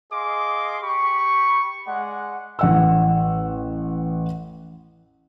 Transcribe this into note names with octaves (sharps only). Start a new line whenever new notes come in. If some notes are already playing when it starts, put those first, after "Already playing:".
G#4 D#5 F5 C6 D6
G4 B5 C#6
G#3 D5 F#5
A1 F#5 E6